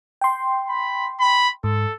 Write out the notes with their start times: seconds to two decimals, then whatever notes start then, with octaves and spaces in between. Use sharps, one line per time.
0.21 G5 C6
0.69 B5
1.20 B5
1.64 G#2 A4